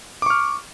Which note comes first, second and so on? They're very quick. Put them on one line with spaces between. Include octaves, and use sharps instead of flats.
D6 C#6 F6